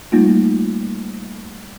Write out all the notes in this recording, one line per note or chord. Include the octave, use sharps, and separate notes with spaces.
G3 A3 A#3 D#4 F4